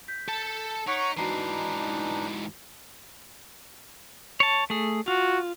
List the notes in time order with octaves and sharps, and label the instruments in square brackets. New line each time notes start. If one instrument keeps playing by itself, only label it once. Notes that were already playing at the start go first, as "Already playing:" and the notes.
[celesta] G6 B6
[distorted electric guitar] A4 A5
[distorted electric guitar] D#4 [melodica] C#5 F#5 C#6 [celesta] B6 D7
[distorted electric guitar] G#2 E3 [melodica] D4 D#4 [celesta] F#4 A#5 C7
[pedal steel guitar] C#5 A5
A3 G#4
[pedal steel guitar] F4 [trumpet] F#4